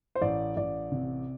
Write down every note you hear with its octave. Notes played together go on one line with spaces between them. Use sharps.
C5
A1 D5
A1 D5
C3